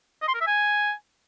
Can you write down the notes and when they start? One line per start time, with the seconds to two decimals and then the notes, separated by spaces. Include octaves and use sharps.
0.22 D#5
0.28 C6
0.35 A#4
0.41 E5
0.47 G#5